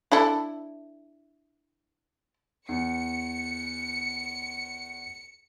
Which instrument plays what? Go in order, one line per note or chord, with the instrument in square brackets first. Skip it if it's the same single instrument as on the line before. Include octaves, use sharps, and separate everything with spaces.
[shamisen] D4 E4 A4
[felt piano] E2 [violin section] C#7